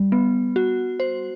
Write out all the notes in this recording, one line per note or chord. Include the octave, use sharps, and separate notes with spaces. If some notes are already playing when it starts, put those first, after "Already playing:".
Already playing: G3
B3
F#4
C5